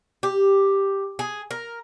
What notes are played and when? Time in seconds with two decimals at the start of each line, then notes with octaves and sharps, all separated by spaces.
0.23 G4
1.19 G#4
1.51 A#4